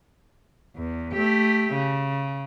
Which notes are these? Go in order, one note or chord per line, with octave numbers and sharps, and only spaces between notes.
E2
A3 G4
C#3